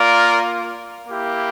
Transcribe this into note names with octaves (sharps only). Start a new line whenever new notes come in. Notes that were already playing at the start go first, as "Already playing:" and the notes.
Already playing: A#3 F4 A#4 D5
A#3 E4 G4